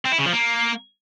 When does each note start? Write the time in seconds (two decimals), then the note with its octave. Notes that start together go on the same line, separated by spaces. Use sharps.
0.05 C4
0.12 E4
0.18 C#3
0.25 F3
0.32 A#3